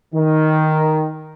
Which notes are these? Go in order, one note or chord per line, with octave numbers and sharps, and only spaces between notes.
D#3